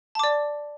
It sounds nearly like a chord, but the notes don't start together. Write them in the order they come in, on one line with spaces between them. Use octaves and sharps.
A5 D6 D5